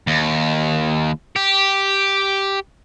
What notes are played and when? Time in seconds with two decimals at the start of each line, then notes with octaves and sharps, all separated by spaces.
0.07 D#2
1.36 G4